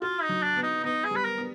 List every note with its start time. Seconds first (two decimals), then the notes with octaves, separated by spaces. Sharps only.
0.02 F4 F#4
0.22 D#4
0.29 F#3
0.43 D4
0.57 B3
0.63 D#4
0.84 B3 D#4
1.05 G#4
1.11 G3 B4
1.25 A#4
1.38 B3